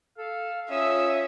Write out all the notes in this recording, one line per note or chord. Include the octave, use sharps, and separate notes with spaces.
A4 F5
C#4 F4 E5 D#6 E6